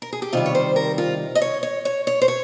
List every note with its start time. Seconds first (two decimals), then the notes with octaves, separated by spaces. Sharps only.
0.02 A#4
0.13 G#4
0.22 G4
0.33 C3 D#3 G3 F4
0.46 C#5
0.55 C5
0.76 A#4
0.98 F4
1.35 D#5
1.42 C#5
1.63 C#5
1.85 C#5
2.07 C#5
2.21 C5
2.28 C#5